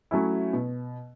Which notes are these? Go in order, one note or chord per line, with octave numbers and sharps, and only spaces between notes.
F#3 A3 C#4 E4
B2